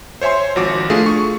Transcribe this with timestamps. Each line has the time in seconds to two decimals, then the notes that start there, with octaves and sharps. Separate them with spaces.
0.21 C5 C#5 E5 G#5 C6
0.56 G#1 F3 F#4 D6
0.90 A3 D4 F4 G#4
1.06 C#6